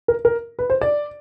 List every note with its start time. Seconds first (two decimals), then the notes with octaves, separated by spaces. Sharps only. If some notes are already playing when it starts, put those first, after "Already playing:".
0.08 A#4
0.25 A#4
0.59 B4
0.70 C5
0.81 D5